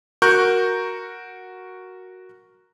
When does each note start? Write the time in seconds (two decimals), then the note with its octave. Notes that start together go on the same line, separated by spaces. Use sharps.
0.22 F#4 A#4 C#6 F#6 G6